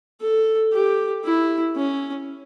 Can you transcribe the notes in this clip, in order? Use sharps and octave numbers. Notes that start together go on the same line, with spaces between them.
A4
G4
E4
C#4